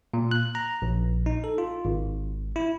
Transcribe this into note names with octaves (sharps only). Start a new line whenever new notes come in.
A#2
F#6
A#5
A#1
D#4
A4
F4
G#1
E4